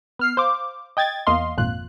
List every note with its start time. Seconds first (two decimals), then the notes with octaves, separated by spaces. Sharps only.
0.19 B3 F6 C7
0.37 C5 F5 D6
0.97 D#5 G5 G#6 A6
1.27 E2 A#3 D#5 F5 C6
1.57 G#1 F2 A#2 F4 F#6